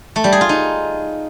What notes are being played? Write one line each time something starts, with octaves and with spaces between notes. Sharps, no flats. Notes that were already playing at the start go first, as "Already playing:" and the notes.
A3
G3
G#4
F4
D#4